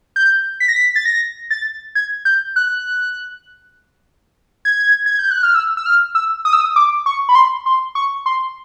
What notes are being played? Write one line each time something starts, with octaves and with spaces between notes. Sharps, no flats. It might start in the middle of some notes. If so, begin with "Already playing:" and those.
G6
B6
A#6
B6
A6
A#6
A6
G#6
G6
F#6
G#6
G#6
G6
F#6
F6
E6
E6
F6
E6
D#6
E6
D#6
D6
C#6
B5
C6
C6
C#6
C6